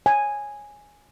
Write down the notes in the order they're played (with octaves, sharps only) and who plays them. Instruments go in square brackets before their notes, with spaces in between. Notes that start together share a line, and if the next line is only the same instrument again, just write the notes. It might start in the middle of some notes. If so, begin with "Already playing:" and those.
[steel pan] G#5